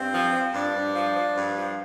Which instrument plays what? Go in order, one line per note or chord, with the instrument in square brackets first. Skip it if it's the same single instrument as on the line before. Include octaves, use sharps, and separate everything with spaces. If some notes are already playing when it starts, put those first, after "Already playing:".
Already playing: [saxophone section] G2 C4
F3
F3
G2 D4
G2
F3
F3
G2
F3